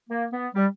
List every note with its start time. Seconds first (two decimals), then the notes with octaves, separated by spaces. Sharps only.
0.09 A#3
0.31 B3
0.54 G3